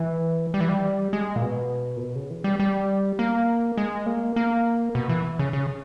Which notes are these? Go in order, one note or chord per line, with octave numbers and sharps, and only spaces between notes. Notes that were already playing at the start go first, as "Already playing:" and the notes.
Already playing: E3
G3
E3
G3
G#3
A#2
B2
A#2
B2
C#3
E3
G3
G3
A#3
G#3
A#3
A#3
B2
E3
C#3
C#3